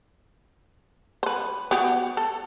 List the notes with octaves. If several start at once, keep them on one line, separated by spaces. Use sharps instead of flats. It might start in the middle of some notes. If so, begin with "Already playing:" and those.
B4 C5
B3 F#4 G4
A4